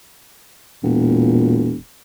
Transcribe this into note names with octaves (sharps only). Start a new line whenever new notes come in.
E1 A#2